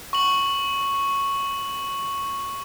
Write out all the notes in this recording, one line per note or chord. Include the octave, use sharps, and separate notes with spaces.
C#6 F#7